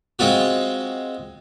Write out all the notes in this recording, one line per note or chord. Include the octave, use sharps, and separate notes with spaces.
G#3 C4 F4 F#4